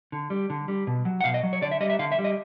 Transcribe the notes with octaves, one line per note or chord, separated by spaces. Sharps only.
D3
G3
D3
G3
B2
F#3
F#5
B2 F5
D#5
F#3
C#5
D3 D5
E5
G3 D#5
E5
D3 F5
E5
G3
D#5